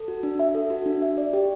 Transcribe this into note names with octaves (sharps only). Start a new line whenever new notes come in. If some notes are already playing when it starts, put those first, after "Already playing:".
Already playing: A4
F#4
D4
E5
A4
F#4
D4
E5
D5
G4